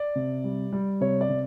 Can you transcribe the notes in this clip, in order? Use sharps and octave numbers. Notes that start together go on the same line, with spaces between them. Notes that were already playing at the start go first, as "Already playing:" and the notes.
Already playing: D5
C3
G3
G3
C3 C#5
D5
C3